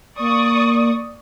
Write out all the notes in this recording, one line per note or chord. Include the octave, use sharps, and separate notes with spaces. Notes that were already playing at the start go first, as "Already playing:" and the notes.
A#3 D5 C#6 D#6